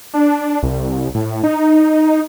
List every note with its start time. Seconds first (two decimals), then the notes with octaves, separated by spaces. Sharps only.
0.14 D4
0.63 C2
1.15 A2
1.44 D#4